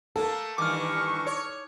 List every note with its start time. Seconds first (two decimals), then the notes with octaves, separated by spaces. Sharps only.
0.16 A3 A#3 A4
0.58 G2 D#3 E3 C#6 D6 F6
1.27 C#5